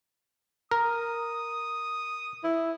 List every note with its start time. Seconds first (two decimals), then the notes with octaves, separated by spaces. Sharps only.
0.71 A#4 D#6
2.44 E4